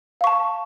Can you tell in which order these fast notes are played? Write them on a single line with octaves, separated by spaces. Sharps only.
F5 C#6 A5